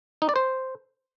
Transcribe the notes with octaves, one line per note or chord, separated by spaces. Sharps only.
D#4
D5
C5